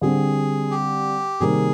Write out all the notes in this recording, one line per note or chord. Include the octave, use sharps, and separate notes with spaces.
D3 G3 C4 G#4
G4
C3 D#3 G3 A#3 G#4